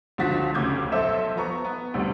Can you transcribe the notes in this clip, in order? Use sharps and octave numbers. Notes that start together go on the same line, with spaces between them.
C#2 D3 F3 F#4 A6 B6
F1 D2 C#3 D6 G6 G#6
B1 A4 C5 E5 E7
F3 B3 A#5 C#6
B3
D2 C3 G3